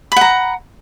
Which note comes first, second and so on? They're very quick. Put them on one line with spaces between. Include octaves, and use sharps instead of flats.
B5 F#5 A#5